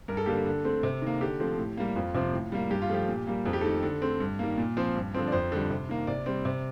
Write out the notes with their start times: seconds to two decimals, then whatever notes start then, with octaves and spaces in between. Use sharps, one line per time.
0.08 G2 A#4
0.17 A4
0.26 D3 G3 A#3 G4
0.35 A4
0.46 D3
0.65 A3 C4
0.83 C3
1.02 D#3 A#3
1.21 D3 G4
1.40 F3 A3 C4
1.59 A2
1.77 G3 A#3
1.96 F2 F4
2.14 C3 F3 C4
2.33 A2
2.52 G3 A#3
2.71 G2 G4
2.82 F4
2.89 F3 A3 G4
3.08 A#2
3.27 G3 A#3
3.45 F2 A4
3.53 G4
3.61 D#3 A3 A4
3.83 D3
4.02 A3 C4
4.20 G2
4.39 D#3 G3 A#3
4.58 A#2
4.77 F3 C4
4.95 G2
5.14 D3 F3 C4
5.27 D5
5.32 F2 C5
5.52 D3 G3
5.70 C3
5.89 D#3 A#3
6.07 C3 D5
6.26 G3 C4
6.45 C3